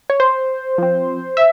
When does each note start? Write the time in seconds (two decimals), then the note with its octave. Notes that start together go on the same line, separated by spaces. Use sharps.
0.10 C#5
0.20 C5
0.78 F3 C4
1.37 E5